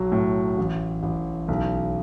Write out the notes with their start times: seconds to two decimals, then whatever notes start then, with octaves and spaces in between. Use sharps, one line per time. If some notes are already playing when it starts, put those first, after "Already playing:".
Already playing: B1 F#3
0.12 A2
0.58 A1
1.03 A1
1.48 B1